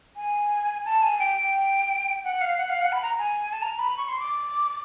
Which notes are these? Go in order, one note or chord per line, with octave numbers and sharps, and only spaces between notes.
G#5
A5
G#5
G5
G5
F#5
F5
F#5
F5
F#5
B5
A#5
G#5
A5
A#5
B5
C#6
C6
D6